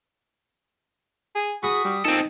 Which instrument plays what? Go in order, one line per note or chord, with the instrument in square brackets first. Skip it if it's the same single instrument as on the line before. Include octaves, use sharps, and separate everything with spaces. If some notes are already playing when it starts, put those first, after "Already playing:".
[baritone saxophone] G#4
[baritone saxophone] F#4 [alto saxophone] G#4 [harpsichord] B5 D#6
[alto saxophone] G3
[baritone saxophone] A#2 [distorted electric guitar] C4 A4 [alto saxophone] D#4